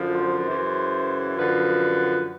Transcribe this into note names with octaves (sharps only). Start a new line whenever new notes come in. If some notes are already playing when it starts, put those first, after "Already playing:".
Already playing: F#2 D3 F3
C5
F#2 C#3 E3
F#2 D3 F3 B4